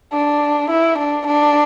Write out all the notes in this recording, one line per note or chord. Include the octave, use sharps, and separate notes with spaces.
D4
E4
D4
D4